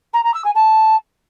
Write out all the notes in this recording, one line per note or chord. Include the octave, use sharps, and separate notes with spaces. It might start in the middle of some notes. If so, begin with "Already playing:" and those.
A#5
A#5
E6
G#5
A5